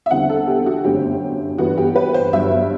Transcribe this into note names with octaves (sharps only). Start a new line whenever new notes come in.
E5
E2 D3 G3 C4 E4 F#5
A4
G4
F#4
G1 F#2 D3 A3 C4 G4
G2 E3 B3 D4 F#4
G4
B4
C5
G1 G2 F#3 E5